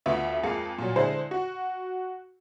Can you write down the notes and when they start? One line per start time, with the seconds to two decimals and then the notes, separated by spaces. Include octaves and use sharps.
0.06 D2 B3 F4 E5
0.43 F2 G#3 A#3 F4 C7 C#7
0.78 A#2 F#3
0.96 D3 G#3 E4 C5
1.31 F#4